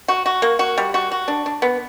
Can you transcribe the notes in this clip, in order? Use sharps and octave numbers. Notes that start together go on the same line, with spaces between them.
F#4
F#4
A#3
F#4
G3
F#4
F#4
D4
D4
B3